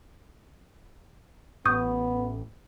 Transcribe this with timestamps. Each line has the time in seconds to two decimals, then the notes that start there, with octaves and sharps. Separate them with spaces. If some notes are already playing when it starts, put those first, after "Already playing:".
1.65 A1 B3 C#6 D#6 G6